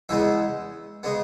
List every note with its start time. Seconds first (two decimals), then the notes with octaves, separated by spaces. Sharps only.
0.09 E2 C#3 G#3 B3 E5
1.03 C#3 G#3 B3